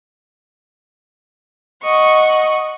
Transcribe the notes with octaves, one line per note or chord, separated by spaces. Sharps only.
D#5 F#5 C#6